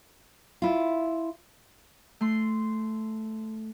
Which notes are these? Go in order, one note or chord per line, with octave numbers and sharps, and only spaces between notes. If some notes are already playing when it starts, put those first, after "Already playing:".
E4 F4
A3 C6